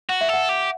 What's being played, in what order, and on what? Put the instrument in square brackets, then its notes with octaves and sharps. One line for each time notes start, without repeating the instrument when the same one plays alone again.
[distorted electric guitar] F#4 [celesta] F#5
[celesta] E5
[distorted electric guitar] A4 [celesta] F#5
[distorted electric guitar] G4